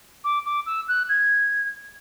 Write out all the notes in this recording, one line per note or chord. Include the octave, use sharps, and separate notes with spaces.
D6
D6
E6
F#6
G#6